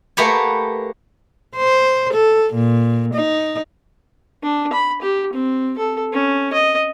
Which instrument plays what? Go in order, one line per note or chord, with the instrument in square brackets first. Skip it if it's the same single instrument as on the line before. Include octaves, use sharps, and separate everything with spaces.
[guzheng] A3 A#3 G4 B4 F#5 G#5
[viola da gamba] C5
A4
A#2
D#4
[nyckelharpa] D4
B5
G4
C4
A4
C#4
D#5